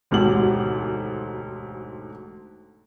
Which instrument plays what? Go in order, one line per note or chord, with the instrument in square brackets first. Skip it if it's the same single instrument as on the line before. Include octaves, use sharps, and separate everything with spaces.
[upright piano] E1 D2 G#2 F#4 G4 F#7